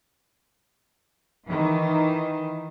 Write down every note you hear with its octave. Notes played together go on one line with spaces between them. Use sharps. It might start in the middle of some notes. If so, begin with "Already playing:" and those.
D#3 E3